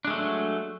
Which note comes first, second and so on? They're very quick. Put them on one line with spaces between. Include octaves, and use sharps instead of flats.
D4 G#3 A3 F#3